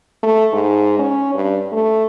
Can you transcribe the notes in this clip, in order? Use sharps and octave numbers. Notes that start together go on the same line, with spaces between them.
A3
G#2
C#4
G2
A3